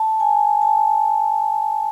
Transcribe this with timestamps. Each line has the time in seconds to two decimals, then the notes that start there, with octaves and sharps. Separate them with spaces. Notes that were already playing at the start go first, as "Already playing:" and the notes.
Already playing: A5
0.20 G#5
0.62 A5